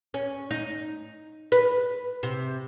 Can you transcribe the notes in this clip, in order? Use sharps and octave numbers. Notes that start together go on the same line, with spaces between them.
C#4
D#4
B4
C3